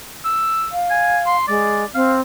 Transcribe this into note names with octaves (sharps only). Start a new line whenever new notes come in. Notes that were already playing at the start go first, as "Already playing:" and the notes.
E6
F5
G#5
C6
G#3 D5
C4 F5